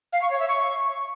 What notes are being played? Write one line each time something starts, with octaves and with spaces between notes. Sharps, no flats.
F5
C#6
C#5
E5
C#6